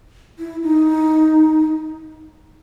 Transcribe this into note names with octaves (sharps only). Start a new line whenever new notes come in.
E4
D#4